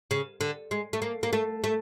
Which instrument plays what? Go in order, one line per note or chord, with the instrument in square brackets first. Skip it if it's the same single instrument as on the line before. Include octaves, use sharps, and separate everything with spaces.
[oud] C#3
D3
G#3
A3
A#3
A#3
A3
A3